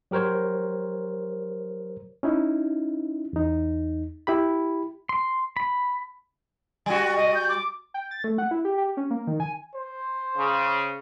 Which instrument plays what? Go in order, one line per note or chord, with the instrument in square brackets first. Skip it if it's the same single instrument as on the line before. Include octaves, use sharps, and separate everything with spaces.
[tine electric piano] F#3 G4 A#4 C5 C#5
[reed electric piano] C#4 D#4 E4
E2 D#4
E4 G4 B5
[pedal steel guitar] C6
B5
[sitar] G3 F#4 [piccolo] G#5
[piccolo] D#5
G6
D6
[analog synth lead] G5
A6
A3
F#5
E4
G4
G4
C#4
A#3
D#3
G#5
[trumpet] C5
[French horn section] C#3